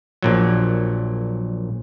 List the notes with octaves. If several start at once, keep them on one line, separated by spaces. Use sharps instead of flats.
A#1 A#2 F#3